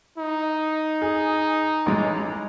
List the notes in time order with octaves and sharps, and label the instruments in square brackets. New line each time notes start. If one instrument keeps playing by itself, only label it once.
[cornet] D#4
[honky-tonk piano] G#4
A1 G#3